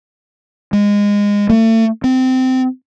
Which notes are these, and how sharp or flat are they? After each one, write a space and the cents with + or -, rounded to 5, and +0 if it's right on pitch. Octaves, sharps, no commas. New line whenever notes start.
G#3 -20
A3 +35
C4 -20